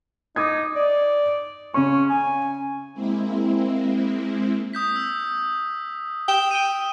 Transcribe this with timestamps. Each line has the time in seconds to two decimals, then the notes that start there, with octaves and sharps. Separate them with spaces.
0.36 D#4 D6 D#6 G#6
0.76 D5
1.74 C#3 C#4 C#6
2.10 G#5
2.93 G#3 A#3 C4 E4
4.73 D#6 G6 B6
4.96 E6
6.28 G5 D#6 E7 G7
6.51 D7 D#7